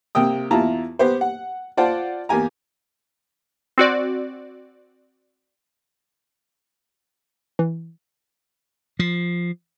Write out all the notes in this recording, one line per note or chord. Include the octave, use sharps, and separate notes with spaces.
C3 A#3 G5 D#6
E2 E4 F4 A5 A#5
B3 G4 C5
F#5
F4 C5 D5 F#5 A5
E2 A#3 G4 G#5 A#5
C4 F#4 D5
E3
F3